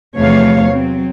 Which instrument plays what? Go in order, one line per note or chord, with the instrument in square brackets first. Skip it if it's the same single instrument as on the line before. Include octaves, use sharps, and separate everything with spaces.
[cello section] E2 C3 F3 A3 C#5 F5
F#3 C4